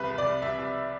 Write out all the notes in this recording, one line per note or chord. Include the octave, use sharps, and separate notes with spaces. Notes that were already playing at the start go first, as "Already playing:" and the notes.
Already playing: C2 B4
C2
D5
C2
C2 E5
C2